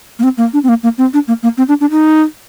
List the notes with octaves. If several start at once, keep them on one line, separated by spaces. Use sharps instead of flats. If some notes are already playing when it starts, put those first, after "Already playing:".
A#3
C4
A#3
D4
C4
A#3
A#3
C4
D4
A#3
A#3
C4
D4
D4
D#4